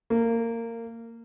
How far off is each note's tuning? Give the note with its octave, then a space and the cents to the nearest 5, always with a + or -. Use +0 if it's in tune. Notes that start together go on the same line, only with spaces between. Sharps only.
A#3 -20